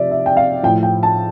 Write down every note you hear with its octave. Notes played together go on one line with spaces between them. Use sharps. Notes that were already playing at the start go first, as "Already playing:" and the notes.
Already playing: C3 F3 D5 E5
E5
G5
F5
A2 F3 G5
G5
A5